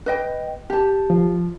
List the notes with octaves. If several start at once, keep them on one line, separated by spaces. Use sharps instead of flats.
B4 D#5 G5
G4 A5
F3